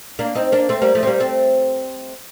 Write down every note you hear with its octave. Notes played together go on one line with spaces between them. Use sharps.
A#3 D4
C4 D#4
A#3 D4
A3 C4
G3 A#3
F3 A3
C4
G3 A#3
A3 C4